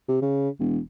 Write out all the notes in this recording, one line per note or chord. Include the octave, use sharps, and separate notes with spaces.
C3
C#3
E1